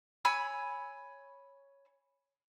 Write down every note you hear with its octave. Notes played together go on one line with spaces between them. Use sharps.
C#5 G#5 B5 E6